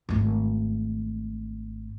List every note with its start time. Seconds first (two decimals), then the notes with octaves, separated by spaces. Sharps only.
0.09 G#1 A3